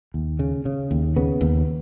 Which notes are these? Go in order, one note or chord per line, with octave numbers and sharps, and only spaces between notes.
D#2
C#3
C#3
D#2
C#3 B3
D#2